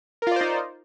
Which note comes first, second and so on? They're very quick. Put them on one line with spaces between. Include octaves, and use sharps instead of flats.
A#4 F4 D5 C5 D#4